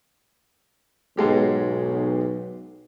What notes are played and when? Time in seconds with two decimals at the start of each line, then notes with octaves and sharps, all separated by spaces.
1.17 B1 G#2 G#3 G4